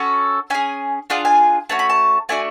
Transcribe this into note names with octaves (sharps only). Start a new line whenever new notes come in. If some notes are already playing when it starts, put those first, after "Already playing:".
Already playing: C#4 F#4 A4
C#4 G#4 G#5
D4 F4 G#4 F#5
G#5
A3 C#4 F#4 A5
B5
A5
A3 D4 F#4 G#5